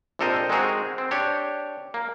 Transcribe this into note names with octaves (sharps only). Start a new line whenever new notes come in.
A#1 C3 A4 A#4 C5 D#5
G#3 C4 D#4 F#4 G#4 A#4
C4
D4 G4 C#5
A#3